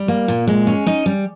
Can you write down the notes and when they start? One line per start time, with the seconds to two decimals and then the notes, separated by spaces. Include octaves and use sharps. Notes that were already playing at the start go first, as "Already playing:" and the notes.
Already playing: G3
0.08 A#3
0.28 A#2
0.48 G#3
0.67 C#4
0.87 D#4 D#5
1.06 G3